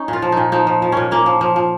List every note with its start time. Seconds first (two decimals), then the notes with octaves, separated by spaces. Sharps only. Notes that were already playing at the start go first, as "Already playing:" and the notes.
Already playing: C#4 D#4
0.08 A#2
0.13 F4
0.22 F3
0.32 A#2 D#4
0.52 F3 D#4
0.67 F3
0.82 F3
0.92 A#2 C#4
1.11 A#2 A#3
1.26 F3
1.41 F3
1.56 F3